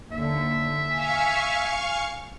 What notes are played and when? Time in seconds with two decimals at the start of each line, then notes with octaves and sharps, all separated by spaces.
0.12 D#2 D3 E5
0.93 F5 G#5 C#6